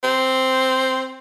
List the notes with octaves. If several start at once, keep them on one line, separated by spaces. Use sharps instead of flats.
C4